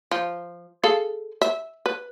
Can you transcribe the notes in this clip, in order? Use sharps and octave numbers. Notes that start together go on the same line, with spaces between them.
F3
G#4 A4 F5
E5
B4